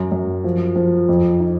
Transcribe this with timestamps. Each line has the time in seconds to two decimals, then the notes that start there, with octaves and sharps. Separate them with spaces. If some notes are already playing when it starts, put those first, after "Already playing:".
Already playing: F#2
0.12 F#2
0.44 F3
0.76 F3
1.09 F2
1.40 D#4